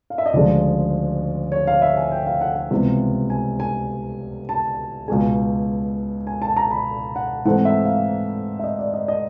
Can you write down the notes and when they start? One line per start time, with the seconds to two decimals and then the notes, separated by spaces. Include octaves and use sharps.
0.10 F5
0.18 E5
0.26 D#5
0.33 D2 C#3 F3 G#3 D5
1.52 C#5
1.67 F5
1.82 E5
1.97 G#5
2.12 G5
2.26 F5
2.41 F#5
2.56 F#5
2.71 C#2 C3 E3 G3 B3
3.30 G#5
3.60 G#5
4.49 A5
5.08 C#2 B2 G#3 G#5
6.27 G#5
6.42 A5
6.57 A#5
6.71 B5
7.16 F#5
7.45 G#2 E3 A3 C4 F#5
7.65 E5
7.85 F5
8.59 E5
8.64 D#5
8.79 D5
8.94 D#5
9.08 D#5